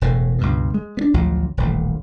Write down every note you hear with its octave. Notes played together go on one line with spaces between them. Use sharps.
E1 E2 A2
C#2 G2 B2
G#3
B3 D4
A1 D2 F3 F#3
D#1 A1 D2